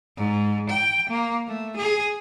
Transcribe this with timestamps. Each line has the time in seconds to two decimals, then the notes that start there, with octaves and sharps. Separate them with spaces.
0.17 G#2
0.70 G5
1.10 A#3
1.48 A3
1.77 G#4